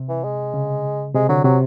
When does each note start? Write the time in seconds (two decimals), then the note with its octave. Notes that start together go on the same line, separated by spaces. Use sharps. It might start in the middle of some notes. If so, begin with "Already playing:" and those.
Already playing: C3
0.09 E3
0.24 G#3
0.54 C#3
1.14 C3 G#3
1.29 D3 F#3
1.44 C3 F#3